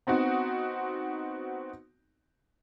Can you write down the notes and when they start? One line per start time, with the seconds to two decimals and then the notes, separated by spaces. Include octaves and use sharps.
0.07 B3 C4 D#4 F#4